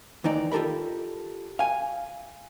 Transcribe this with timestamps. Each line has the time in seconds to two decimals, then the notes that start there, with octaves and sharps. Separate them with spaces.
0.24 D#2 E3 D#4 D5
0.52 F4 G4 A4 A#4 B5
1.59 F5 G#5